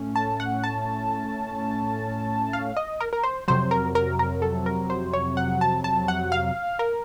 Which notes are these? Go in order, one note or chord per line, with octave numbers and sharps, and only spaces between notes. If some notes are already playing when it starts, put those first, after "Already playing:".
Already playing: A2 A3 C#4
A5
F#5
A5
F5
D#5
A#4
A#4
C5
F2 C3 F#3 C5
A#4
A#4
A#4
A4
A#4
C5
C#5
F#5
A5
A5
F#5
F5
A#4